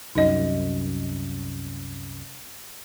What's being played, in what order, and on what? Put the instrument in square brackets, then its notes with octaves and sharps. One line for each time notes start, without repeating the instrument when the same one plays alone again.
[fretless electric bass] C2 F#2 [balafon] D#4 D#5